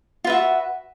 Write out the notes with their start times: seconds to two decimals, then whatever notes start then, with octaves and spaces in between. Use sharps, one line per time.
0.24 F4
0.27 B4
0.30 E5
0.32 F#4